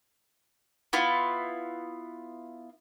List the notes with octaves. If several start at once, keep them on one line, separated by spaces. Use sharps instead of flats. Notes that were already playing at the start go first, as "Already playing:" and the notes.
B3 E4 F4